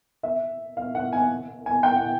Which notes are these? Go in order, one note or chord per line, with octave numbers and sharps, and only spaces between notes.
E5
F5
F#5
G#5
G#5
G5
F#5